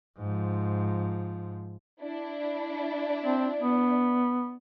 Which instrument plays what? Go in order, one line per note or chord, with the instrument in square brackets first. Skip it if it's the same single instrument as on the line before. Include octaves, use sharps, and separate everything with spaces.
[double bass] G#2 F3
[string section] D4 E4
[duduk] C4
B3